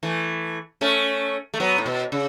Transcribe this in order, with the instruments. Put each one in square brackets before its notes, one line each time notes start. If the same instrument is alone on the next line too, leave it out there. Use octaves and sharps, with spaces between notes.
[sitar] E3 A3
A3 C#4
A3
F#3 B3
A2
B2
C#3